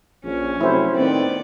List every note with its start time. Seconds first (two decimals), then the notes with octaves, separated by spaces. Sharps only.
0.25 A#1 C#4
0.61 C3 F#3 A3 E4 C5
0.95 A2 D#3 B3 C4 D5